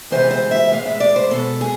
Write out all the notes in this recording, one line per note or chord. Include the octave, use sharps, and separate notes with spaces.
D2 C3 E3 G#3 B3 C5
C5
E5
A2 E3 G#3 B3 F5
E5
D5
C5
B2 G#3 B3 A4
G#4